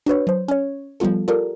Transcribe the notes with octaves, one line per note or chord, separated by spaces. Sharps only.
D4 F#4 B4 C#5
F#3 C5
C#4 C#5
F3 G3 B3 F4 A4
F4 G4 A4 A#4 D5